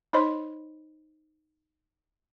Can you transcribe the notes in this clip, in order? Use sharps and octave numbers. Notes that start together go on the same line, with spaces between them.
D#4 C5 C#5 D#5 B5 C6